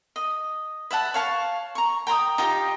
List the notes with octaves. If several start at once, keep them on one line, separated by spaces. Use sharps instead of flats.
D#5
B4 E5 F#5 A5
C#5 F5 A5 C#6
A#5 C#6
G5 A#5 C6 D#6
D#4 F4 G4 D#5